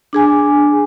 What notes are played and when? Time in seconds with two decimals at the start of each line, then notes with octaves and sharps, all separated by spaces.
0.13 D4 G#4 G#5